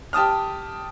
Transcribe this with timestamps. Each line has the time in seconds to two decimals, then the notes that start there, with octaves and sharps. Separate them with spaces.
0.13 G4 A5 D#6 F6